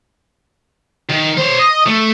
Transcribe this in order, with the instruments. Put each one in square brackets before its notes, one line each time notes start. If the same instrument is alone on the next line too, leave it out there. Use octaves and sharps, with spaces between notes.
[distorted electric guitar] D#3
C5 C#5
D#5
A3